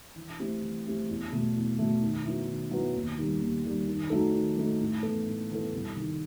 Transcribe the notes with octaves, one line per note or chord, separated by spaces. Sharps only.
E3
A3 C4 E4 G4
E3
A3 C4 E4 G4
E2
B2 A3
E2
B2 A3
D#3
F#3 B3 E4
D#3
F#3 B3 E4
D#2
D#3 G3
D#2
D#3 G3
D#3
F#3 A3 D#4 A4
D#3
F#3 A3 D#4 A4
A2
E3 B3 E4 A4
A2
E3 B3 E4 A4
C2
C3 D#3